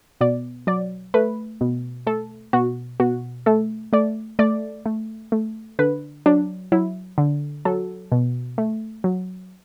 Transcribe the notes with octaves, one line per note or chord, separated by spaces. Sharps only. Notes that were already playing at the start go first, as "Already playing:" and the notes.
B2 D5
F#3 D5
A3 B4
B2
A3 A4
B2 F#4
B2 F#4
A3 A4
A3 D5
A3 D5
A3
A3
D3 B4
F#3 D4
F#3 E4
D3
F#3 A4
B2
A3
F#3